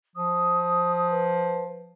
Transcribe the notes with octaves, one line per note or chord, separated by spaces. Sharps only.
F3 D#6
B4